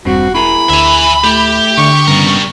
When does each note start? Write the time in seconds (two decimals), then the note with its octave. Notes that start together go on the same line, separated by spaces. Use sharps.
0.05 E1 G2 C4 F#4
0.35 E4 G#4 A#4 B5
0.69 D2 E5 G#5
1.24 A3 E4 G4
1.78 D3 C#6
2.07 G2 C#3 G3 B3 A#4